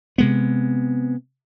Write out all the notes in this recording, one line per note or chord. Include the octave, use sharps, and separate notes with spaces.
C3 G#3 B3